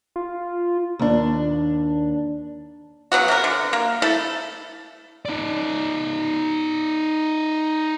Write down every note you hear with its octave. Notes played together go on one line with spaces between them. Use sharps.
F4
D#2 D4
C#3 F#3 B3 F#4
C3 F#4 A#4
D3
A#3
A3 E4 A4
D#4 D5